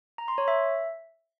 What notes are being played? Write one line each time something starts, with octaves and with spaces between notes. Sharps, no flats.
A#5
C6
C#5
E5